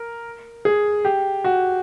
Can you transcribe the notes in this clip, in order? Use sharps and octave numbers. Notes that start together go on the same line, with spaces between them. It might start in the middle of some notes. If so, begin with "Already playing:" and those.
Already playing: A#4
G#4
G4
F#4